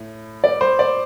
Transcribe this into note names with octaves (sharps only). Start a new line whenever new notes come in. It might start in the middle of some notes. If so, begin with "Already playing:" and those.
Already playing: A2
D5
C5
D5